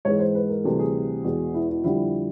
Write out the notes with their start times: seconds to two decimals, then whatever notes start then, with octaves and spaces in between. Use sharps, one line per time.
0.05 G#2 E3 G#3 C#5
0.19 C5
0.35 B4
0.49 A#4
0.64 D2 C3 E3 G3 A4
0.79 G#4
1.24 E2 B2 G#3
1.54 E4
1.69 E4
1.84 F2 D3 G3 E4